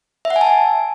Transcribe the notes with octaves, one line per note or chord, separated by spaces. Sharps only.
E5
F#5
G#5
A5
G#5